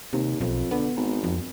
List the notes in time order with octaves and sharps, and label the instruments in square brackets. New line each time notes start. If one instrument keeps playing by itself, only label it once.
[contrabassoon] D#2 [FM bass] C3
[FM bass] B1 [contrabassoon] F2
[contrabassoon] D3 [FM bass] B3
[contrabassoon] G#1
[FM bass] F2